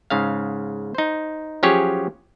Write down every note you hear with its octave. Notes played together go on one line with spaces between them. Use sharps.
G#2 C#3 F5
D#4 C5
F3 F#3 C#4 G4 G#4 C#5